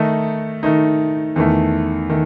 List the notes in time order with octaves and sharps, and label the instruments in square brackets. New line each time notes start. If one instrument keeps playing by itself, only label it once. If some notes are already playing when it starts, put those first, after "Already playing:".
Already playing: [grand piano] D#3 A3 D#4
D#3 A3 D#4
E2 D#3 A3
D#3 A3